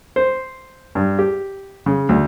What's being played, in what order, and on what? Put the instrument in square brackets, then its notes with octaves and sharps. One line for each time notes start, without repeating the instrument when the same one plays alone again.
[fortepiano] C5
G2
G4
C#3
D2